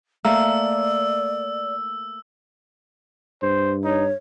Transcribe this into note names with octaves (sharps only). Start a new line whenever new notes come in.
A3 A#3 D5 E6
G2 C5
D#4 C#5